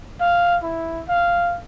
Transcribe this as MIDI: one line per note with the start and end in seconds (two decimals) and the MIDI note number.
0.20 0.56 77
0.63 1.03 64
1.08 1.58 77